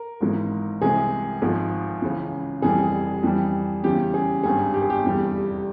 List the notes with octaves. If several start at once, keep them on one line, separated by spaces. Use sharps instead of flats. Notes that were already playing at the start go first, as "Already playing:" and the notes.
Already playing: A#4
G#1 G#2 E3 G#3
C2 C3 E3 G#3 G#4
G#1 G#2 F3 G#3
C#2 C#3 E3
F1 F2 E3 G3 G#4
F2 E3 G3
E2 C#3 E3 G3 G4
G#4
G#1 G2 G3 G#4
G4
G#4
G4
F1 E2 E3 G3